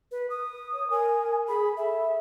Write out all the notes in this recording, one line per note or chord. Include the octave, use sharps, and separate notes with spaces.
B4
D#6
C#5
A#4 G#5
G#4 B5
A4 E5